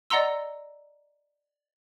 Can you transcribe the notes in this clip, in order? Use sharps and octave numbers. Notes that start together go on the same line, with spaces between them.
D5 D#5 F#5 A#5 C6 E6